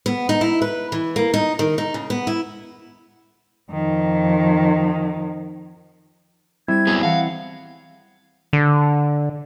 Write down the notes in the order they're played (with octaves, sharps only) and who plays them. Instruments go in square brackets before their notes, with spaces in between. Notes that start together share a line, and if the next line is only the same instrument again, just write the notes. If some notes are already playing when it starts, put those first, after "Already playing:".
[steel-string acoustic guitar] B3
D#4
E4
B4
E3
A#3
D#4
D#3
D#4
C#3
B3
E4
[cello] F2 D#3
[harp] G3 E5 [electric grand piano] C4 E4 [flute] G#6
[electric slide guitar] F#3 B3 G#4
[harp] E3 A5 A#6 [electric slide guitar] F5 [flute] F#5
[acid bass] D3